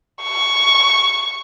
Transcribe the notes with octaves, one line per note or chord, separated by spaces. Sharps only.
C#6